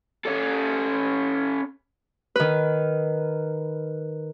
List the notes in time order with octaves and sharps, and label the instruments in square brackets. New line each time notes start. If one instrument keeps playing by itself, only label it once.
[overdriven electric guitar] C#4 A4
[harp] D#3 B4